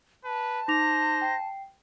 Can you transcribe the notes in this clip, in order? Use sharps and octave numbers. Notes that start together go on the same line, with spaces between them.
B4 A5
D#4 C5 D6 A#6 F7
G5 C7